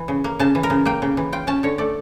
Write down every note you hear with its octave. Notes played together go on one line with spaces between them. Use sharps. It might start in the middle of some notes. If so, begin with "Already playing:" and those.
Already playing: E3
C#3
A#3
C#3 A5
E3
A#4
C#3
A#3 G5
C#3
E3
F4 G5
C#4 A5
D3 C#5
A3 D5